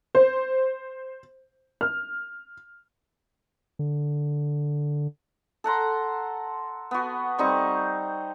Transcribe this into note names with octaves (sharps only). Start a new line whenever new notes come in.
C5
F6
D3
A4 F#5 A#5 C6
B3 F#4
G3 C4 D#4 C#6